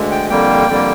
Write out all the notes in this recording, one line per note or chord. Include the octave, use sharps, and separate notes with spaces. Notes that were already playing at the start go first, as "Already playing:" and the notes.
Already playing: D2 D3 G#3
G5
F2 D3 G3 A#3 G5
F2 D3 G3 A#3